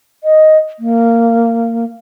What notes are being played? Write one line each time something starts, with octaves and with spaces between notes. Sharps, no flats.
D#5
A#3